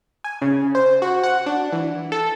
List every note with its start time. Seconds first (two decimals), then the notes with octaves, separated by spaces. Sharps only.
0.24 G#5
0.42 C#3
0.75 C5
1.02 F#4
1.23 F#5
1.46 D4
1.73 E3
2.12 A4